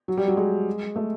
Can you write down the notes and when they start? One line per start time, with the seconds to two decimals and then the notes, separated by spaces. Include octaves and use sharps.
0.08 F#3
0.17 G3
0.28 F#3
0.37 G#3
0.96 A3